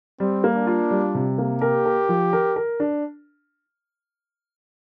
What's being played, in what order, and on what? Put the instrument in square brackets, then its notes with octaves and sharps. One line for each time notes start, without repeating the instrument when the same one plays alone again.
[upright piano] G3 [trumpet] C4
[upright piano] A#3
[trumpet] D4
[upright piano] F4
G3
C3
A#3
[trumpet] G4 [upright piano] A#4
[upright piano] A#4
F3
A#4
A#4
D4